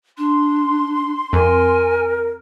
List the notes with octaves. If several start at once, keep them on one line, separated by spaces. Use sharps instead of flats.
D4 C6
F2 A#4 G#5